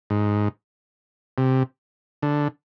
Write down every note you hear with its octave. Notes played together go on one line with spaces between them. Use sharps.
G#2
C3
D3